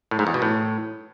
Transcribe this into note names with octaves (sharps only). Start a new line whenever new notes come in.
A2
G#2
E2
B2
A2